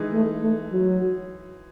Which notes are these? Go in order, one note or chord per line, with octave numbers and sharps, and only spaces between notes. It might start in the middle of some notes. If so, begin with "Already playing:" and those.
Already playing: E3 G#3 D#4
A3
A3
F#3